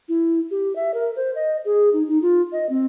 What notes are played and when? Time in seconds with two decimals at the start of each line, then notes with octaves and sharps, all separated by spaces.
0.09 E4
0.51 G4
0.76 E5
0.94 A#4
1.16 C5
1.35 D#5
1.65 G#4
1.93 D#4
2.08 D#4
2.22 F4
2.52 D#5
2.69 C4